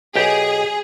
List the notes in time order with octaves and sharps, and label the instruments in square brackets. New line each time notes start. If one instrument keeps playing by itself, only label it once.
[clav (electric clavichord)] B1 G4 [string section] G#4